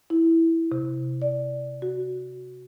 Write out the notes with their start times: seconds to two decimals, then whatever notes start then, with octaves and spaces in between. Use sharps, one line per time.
0.10 E4
0.72 C3
1.22 D5
1.82 F#4